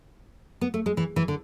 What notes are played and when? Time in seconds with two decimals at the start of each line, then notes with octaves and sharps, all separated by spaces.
0.61 B3
0.74 A3
0.86 G#3
0.97 E3
1.16 E3
1.28 D3